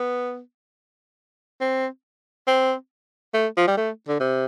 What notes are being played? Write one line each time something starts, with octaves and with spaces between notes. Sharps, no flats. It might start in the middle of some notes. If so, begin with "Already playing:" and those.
Already playing: B3
C4
C4
A3
F3
G3
A3
D3
C3